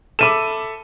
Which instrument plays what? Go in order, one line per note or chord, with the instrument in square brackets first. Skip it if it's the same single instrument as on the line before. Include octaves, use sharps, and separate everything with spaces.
[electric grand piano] A4 E5 B5 [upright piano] D6 D#7 E7